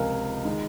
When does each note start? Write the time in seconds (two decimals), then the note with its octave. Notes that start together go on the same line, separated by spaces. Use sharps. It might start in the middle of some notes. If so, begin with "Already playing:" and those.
Already playing: C#2 C3 F3 G#3 A#4 F5 G#5
0.45 D#3 G#3